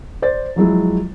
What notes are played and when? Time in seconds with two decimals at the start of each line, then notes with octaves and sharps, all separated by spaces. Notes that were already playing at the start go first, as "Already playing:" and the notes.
0.22 C5 D5 A6
0.56 F3 F#3 G#3 E4